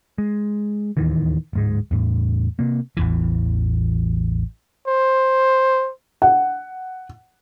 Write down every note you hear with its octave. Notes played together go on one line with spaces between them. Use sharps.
G#3
D1 D#2 D#3 E3
D1 G#2 G#3
E2 A2
C3 A#3
A1 E2 E3
C5
F#5